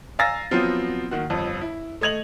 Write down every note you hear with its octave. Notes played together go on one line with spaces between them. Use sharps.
F5 G#5 A#5 E6 A6 A#6
F3 F#3 B3 C4 F4
D#3 A#3 F#4
G1 F2
E4
A3 D#5 G#6 F7 F#7